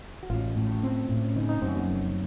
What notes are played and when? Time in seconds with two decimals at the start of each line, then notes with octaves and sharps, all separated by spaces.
0.23 F#4
0.30 A1 C#4 F4
0.56 A2
0.83 C4
1.09 A2
1.25 C#4
1.36 C#3 C4 D#4
1.48 C4 D#4
1.61 F#2 A3 C4
1.75 F#3 A#3
1.88 F1